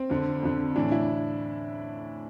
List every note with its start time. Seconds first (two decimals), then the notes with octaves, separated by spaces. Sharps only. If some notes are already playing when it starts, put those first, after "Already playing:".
Already playing: C4
0.10 F2 D3
0.43 F2 D3
0.76 A2 E3 D4
0.91 E4